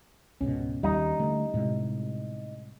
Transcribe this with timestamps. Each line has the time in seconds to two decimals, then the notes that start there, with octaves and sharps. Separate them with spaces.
0.41 C#2 G#2 B2 C#4
0.83 D#2 G3 D#4
1.19 D3 A3
1.54 A2 C3 G#3